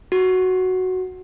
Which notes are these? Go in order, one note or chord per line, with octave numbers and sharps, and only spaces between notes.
F#4